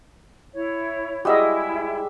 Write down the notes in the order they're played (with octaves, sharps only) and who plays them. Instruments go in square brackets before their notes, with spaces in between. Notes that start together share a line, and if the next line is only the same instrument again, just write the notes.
[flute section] E4 C#5
[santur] G3 G#3 E5 [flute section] E4 [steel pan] F#4 D#5